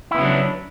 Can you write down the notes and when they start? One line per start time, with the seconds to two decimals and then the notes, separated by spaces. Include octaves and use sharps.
0.11 E4
0.14 B3
0.18 C#3
0.22 F#3
0.25 D4